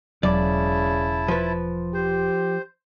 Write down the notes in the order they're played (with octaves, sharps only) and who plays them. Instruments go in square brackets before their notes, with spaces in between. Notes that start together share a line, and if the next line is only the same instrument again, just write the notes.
[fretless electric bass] E1 F#3 [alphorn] C#3 [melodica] E4 A5 [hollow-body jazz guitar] D5
[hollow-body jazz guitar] F3 B4
[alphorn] G4 [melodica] C5